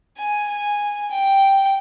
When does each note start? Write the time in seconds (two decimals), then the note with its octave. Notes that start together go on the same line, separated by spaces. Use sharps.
0.17 G#5
0.48 G#5
1.11 G5